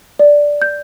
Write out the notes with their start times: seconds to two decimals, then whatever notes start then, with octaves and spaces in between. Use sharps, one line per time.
0.19 D5
0.62 G6